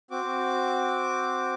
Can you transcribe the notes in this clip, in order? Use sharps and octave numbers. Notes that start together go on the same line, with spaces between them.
C4 F#4 D6